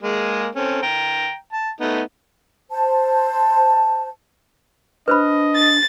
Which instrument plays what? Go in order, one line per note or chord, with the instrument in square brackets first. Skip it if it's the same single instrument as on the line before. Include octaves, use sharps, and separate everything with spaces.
[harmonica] G#3 A#3 G#4
C4 C#4 A4
G5 A#5
A5
A3 B3 D#4
[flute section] C5 A5
[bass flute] D4 [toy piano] B4 C5 B5 [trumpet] D#5
[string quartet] A6